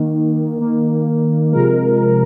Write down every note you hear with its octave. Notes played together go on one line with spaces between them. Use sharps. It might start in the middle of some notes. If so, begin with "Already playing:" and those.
Already playing: D#3 A#3
D#3 A#3
C3 F3 G#3 A#4